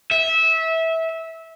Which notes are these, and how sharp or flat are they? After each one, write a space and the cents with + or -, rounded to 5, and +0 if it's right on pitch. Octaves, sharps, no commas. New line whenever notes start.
E5 -20